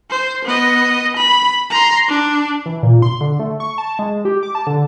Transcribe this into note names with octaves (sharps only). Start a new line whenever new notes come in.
C5
B3 D#5
B5
A#5 C6
D4
E3
A#2
C6
D3
A3
C#6
A5
G#3
G4
D6
A5
D3